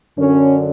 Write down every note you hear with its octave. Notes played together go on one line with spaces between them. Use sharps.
F#2 D3 C#4